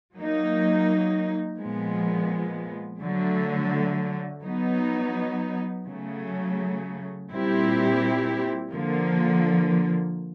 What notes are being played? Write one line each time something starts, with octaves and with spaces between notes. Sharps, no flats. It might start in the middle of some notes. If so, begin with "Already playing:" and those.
F#3 A#3 D#4
A#2 F3 G#3 B3
D3 F#3 A3
F#3 B3 D#4
C#3 F#3 A3
A#2 G3 C4 E4 G4
D3 F3 A#3